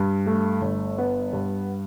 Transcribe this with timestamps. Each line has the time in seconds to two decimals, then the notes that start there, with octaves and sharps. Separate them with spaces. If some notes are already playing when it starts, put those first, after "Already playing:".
Already playing: G2
0.26 A3
0.62 G1
0.98 B3
1.33 G2